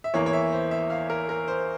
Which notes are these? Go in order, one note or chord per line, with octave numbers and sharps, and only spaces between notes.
E5
E2 E3 A#3 C#5
C#5
E5
C5
E5
F5
A#4
A#4
C5